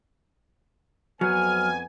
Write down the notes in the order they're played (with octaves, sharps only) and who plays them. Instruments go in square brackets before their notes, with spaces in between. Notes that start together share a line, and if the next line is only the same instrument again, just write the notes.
[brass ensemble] F2 B3 G#5 [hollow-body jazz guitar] F#3 [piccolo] F6